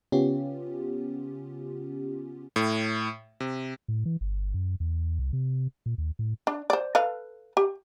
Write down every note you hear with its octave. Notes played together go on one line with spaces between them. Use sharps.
C#3 B3 C#4 F4 G4
A2
C3
A2
E3
G1
F#2
E2
C2
C3
A#2
D#2
A2
D4
C5 D5
A4 B4 F5
G4